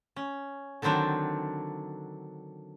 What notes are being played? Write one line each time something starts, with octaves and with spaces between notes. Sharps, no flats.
C#4
D3 D#3 F#3 C4 D4